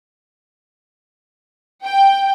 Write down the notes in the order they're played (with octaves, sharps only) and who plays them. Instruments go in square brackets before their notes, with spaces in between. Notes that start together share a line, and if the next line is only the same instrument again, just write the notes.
[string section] G5